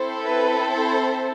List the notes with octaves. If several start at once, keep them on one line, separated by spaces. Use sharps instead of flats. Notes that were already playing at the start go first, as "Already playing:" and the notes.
Already playing: C4 E4 A4 C5
B4
C5